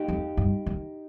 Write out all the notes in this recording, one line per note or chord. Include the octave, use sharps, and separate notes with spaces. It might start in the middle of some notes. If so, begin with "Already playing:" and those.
Already playing: D#4 G4
F2
G2
D#3